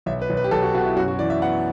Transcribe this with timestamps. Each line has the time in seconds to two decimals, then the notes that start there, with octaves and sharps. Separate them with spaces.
0.06 B1 E5
0.22 B4
0.30 B1
0.37 B4
0.44 G4
0.51 B1 A4
0.62 F#4
0.75 B2 F#4
0.85 E4
0.96 F#2 F#4
1.08 F#4
1.19 E3 D5
1.30 E5
1.42 B3 F#5